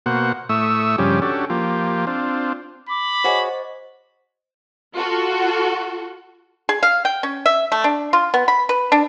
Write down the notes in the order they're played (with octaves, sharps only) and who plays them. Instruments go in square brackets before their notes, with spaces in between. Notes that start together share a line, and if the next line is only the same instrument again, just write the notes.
[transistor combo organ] B2 A#3 F#4 C5 F#5
A2 A3 E5 C#6 D#6 E6
G2 C#3 F3 G3 C#4 G4
C#4 D4 F#4 G4 A4
F3 A#3 F4 G4
C4 D4 F4
[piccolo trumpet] B5 [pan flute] D6
[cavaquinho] F#4 G#4 C#5 [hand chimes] C5 D#5
[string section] F4 F#4 A4
[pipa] G#4
F5
G5
C#4
E5
A3
D4
F4
B3
B5
B4
D4